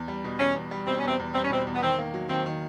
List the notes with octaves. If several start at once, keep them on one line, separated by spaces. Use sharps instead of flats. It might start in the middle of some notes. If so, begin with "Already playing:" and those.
Already playing: E2
G3
B2
E2 C#4
E2
G3
B2 C4
E2 C#4
C4
E2
G3 C4
C#4
B2 C4
E2
B3
D#3 C4
A#3
F#3
D#3 C4
D#3